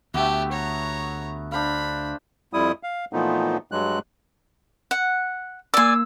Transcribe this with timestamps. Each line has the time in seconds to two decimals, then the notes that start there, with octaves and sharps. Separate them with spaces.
0.14 D2 A3 B3 G4 E5
0.52 C#5 A#5
1.52 D4 C5 F5 B5
2.53 F2 G3 E4 D#6
2.83 F5
3.13 A#2 E3 F3 A3 B3 D#4
3.72 G2 F#3 G#3 F#6
4.91 F#5
5.74 A#3 D5 G#5 E6